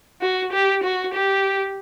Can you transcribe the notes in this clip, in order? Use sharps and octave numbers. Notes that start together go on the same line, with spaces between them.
F#4
G4
F#4
G4